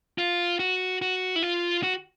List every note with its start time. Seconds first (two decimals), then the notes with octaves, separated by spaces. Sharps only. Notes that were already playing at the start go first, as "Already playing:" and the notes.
0.18 F4
0.59 F#4
1.02 F#4
1.36 E4
1.43 F4
1.83 F#4